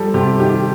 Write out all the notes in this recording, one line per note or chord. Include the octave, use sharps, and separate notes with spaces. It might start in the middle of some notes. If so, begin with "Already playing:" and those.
Already playing: F3 G3 A4
C3 G4
D#3 G4